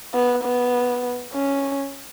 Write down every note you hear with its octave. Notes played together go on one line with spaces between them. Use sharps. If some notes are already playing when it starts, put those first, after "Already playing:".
B3
B3
C#4